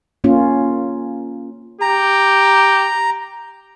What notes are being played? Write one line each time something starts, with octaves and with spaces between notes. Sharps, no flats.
A#3 C#4 F4
G4 A#5